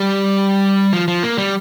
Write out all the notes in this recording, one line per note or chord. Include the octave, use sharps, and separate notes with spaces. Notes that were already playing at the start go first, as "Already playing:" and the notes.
Already playing: G3
F3
F3
A#3
G3